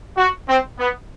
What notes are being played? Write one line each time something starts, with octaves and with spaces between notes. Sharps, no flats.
F#4
C4
B3